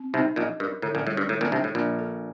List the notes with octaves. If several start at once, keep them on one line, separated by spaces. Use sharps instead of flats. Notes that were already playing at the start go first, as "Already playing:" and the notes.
Already playing: C4
C2 C3 D#4
A#1 A#2 D#5
G2 A#4
A2 D3
A#1 A#2
A2 G3
G2
A2 D3
A#1 A#2
C2 C3 D4
A2
A#1 A#2 D4
A4